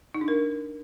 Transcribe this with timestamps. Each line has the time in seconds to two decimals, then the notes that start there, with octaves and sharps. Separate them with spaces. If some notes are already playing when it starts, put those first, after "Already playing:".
0.14 D#4
0.21 D4
0.28 A#4